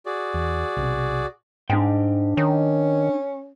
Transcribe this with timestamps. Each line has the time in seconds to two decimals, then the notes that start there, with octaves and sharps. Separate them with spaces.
0.06 F#4 G#4 D5
0.34 E2
0.77 B1 C3
1.70 G#2 D4 G5
2.37 D#3 C#4